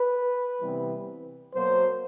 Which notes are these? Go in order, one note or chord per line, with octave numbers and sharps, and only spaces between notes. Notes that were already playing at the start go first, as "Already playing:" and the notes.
Already playing: B4
C3 E3 G3 B3
B2 F#3 A#3 C5